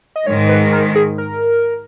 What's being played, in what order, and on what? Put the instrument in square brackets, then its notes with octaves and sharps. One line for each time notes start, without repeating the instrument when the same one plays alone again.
[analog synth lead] D#5
[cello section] G#2 D#3 G#3 [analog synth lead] C#5
[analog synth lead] B4
A#4
G#4
A#4